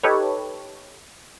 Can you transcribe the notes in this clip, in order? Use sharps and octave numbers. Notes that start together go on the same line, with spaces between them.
D#4 G4 A4 B4 C#5